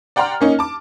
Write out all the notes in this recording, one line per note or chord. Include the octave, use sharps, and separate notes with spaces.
D5 F#5 G5 A#5 C6 F6
A#3 C#4 D#4
A5 D6